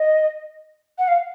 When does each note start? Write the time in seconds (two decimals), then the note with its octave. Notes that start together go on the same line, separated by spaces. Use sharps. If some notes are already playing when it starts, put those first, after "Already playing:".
Already playing: D#5
0.98 F#5
1.08 F5